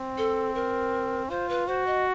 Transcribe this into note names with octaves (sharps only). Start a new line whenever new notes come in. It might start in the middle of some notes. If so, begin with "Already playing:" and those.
Already playing: C4
A4
A#4
F4 C5
B4
F#4 C5
D#5